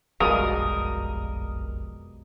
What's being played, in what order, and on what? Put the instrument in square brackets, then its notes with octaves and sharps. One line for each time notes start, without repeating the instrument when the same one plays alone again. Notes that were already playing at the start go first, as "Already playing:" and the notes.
[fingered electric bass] F#1 B1 F2 [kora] B2 G3 G#3 [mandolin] A#4 [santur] D#6